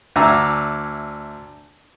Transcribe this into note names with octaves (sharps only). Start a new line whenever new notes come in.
D2 D4 E5 G#5 A#5 E6